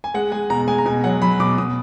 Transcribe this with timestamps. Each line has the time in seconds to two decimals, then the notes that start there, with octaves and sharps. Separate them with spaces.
0.04 G#5
0.14 G#3 F#5
0.32 G#3 G#5
0.50 B2 A#5
0.67 G#3 G#5
0.78 A#5
0.86 B2 G#5
1.04 F#3 F#5
1.22 F#3 B5
1.40 B2 D6
1.58 B2 D#6